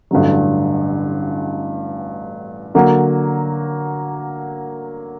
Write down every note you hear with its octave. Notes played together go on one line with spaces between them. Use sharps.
A1 G2 D3 F#3
D3 F#3 A#3 F#4